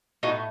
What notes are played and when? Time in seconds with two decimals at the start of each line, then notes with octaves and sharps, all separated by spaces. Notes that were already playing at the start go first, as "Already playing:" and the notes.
0.23 A2 A3 D#4 F#4